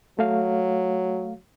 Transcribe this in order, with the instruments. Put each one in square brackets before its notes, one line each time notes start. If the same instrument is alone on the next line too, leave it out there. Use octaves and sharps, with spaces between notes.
[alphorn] F#3 [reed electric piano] A3 F5